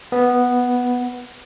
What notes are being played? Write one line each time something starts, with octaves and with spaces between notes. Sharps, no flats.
B3